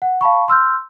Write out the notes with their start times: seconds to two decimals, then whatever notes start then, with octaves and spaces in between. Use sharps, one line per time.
0.02 F#5
0.21 F5 A5 B5 C#6
0.48 C6 E6 F6 G6